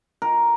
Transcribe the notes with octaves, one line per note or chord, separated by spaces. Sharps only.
A#4